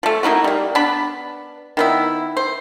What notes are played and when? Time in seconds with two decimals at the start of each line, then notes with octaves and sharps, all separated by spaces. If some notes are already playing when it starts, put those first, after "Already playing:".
0.03 F3 A3
0.23 A#3 D#4 E4 F#4
0.44 G3 A#3
0.75 B3 D4 B5
1.77 D#3 B3 E4
2.37 C5